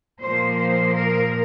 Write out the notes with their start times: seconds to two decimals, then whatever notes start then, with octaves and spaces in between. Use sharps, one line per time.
0.21 A#2 F3 A#3 C5
0.59 C5
0.96 A#4